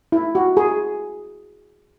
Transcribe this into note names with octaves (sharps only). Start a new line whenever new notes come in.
E4
F#4
G#4